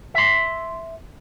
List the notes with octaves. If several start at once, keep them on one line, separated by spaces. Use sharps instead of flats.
E5 C6